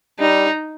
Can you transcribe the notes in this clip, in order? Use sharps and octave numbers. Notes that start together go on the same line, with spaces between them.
G3 D#4